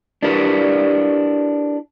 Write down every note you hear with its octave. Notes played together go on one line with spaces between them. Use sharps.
D4 E4 G4 A#4 B4 D5